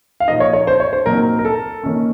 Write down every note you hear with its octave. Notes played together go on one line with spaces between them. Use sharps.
F5
A#2 F3 A#3 D#4 D#5
C#5
C#5
C5
C#5
C5
A#2 F#3 C4 D#4 A#4
A#4
A4
D#3 A#3 C#4